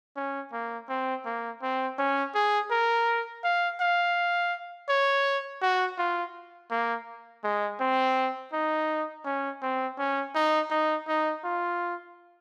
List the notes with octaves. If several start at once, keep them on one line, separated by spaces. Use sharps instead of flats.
C#4
A#3
C4
A#3
C4
C#4
G#4
A#4
F5
F5
C#5
F#4
F4
A#3
G#3
C4
D#4
C#4
C4
C#4
D#4
D#4
D#4
F4